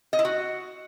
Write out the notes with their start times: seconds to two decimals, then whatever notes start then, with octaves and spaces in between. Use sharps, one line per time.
0.13 D#5
0.19 E4
0.25 F#4